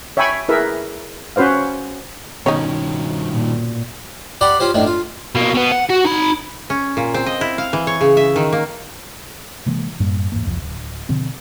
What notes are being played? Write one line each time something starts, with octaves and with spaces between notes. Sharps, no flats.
C#5 E5 G5 G#5 B5 C#6
E4 G#4 A#4 B4 E5
C#4 F#4 B4 C5 F5
G2 B2 D#3 C#4 D#4 C#5
A#2
G4 D5 F#5 B5 C6
C#4 F4 G4 C5
A2 D#3 D4
F4
B2 A#3
B2 B3
F#5
F#4
D#4 B5
C#4
A#2
C4
D#5
E4
F5
E3
C#5
C#3
E5
D#3
A#3
C3 E3 G#3 A#3
F#2 A2 G3 A#3
E2 G#2 A#3
D#1 C2 F2
D1
B2 D3 F3 C4